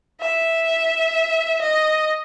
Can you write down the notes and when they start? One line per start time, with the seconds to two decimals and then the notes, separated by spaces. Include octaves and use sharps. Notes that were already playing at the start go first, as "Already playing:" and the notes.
0.21 E5
1.62 D#5